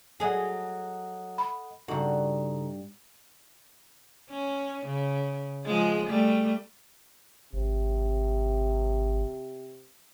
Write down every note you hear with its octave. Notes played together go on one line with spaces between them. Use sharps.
F#3 G#4 A4 D#5 F#5
B5
G2 C#3 D#4 F#4 A4
C#4
C#3
F3 G#3 G#4
G3 A3
G#1 C3